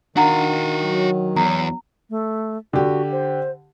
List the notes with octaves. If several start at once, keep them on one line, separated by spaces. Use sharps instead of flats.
D#3 D4 F#4 F5 F#5 A#5
F#3
E2 A#5
A3
D3 F#4 G4
C5